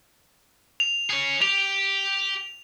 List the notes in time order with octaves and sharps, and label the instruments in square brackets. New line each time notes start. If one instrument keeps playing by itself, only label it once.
[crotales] F7
[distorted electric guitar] G#4 C#5
[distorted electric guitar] G4 [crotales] F7